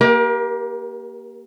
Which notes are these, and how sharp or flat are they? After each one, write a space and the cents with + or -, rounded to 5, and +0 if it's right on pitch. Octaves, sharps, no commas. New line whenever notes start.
A#3 +0 G4 +0 A#4 +35